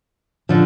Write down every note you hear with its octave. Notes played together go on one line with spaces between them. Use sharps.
D3 F3